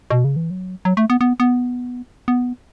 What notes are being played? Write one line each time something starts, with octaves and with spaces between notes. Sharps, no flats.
B2
C#3
E3
F#3
F#3
A3
B3
B3
B3
B3